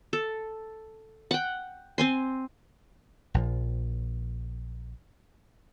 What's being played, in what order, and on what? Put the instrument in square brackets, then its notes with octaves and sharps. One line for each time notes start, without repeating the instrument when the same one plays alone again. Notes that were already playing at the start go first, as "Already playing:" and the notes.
[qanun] A4
F#5 G5
C4 G#5 C6
[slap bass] A#1 F3